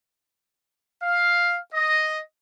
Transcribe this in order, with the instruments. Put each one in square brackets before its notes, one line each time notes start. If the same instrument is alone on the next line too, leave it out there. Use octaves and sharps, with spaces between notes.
[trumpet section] F5
D#5